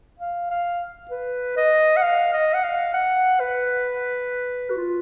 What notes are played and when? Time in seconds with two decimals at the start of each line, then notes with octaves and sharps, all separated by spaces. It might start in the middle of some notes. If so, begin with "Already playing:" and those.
0.19 F5
0.50 F5
1.11 B4
1.57 D#5
1.97 F#5
2.03 F5
2.33 D#5
2.54 F#5
2.64 F5
2.94 F#5
3.40 B4
4.70 F#4
4.77 F4